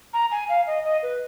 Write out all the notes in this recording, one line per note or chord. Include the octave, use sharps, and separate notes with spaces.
A#5
G#5
F5
D#5
D#5
B4